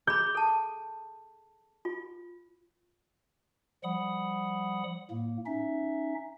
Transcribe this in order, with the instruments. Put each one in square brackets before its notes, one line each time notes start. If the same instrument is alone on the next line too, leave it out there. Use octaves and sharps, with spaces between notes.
[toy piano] G#4 B5 [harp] G6
[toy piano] A4 A5
F4
[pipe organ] F3 G3 F#5 B5 D#6
A2 A#3
C#4 D#4 E5